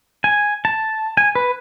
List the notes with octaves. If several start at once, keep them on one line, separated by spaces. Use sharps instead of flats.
G#5
A5
G#5
B4